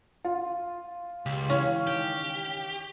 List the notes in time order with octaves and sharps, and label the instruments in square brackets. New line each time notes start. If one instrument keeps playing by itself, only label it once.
[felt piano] F4
[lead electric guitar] C#2 [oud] G4
[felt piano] E3 [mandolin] C#4 [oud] C#5 F5
[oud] D#3 [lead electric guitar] G4